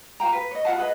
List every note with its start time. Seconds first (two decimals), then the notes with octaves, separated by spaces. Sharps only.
0.20 F4 F5 G5 A#5
0.32 B4
0.51 C#5 D#5
0.65 F4 E5 F#5 A5
0.78 G#4 B4 D#5